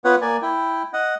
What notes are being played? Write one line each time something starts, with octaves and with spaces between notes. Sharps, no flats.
B3 F4 B4 C#5 F#5
A#3 D5 G#5
E4 G5
D#5 F#5